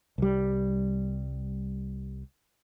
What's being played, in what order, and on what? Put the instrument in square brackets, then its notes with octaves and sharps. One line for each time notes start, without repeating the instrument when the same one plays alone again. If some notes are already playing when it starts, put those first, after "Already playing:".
[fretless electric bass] C2 G3